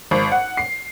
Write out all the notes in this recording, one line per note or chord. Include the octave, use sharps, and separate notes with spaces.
G#1
F#5
C7